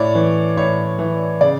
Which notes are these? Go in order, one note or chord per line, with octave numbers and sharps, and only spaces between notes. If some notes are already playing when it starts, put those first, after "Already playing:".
Already playing: A2 C#5 D5
E3
A2 C#5
E3
C#3 D5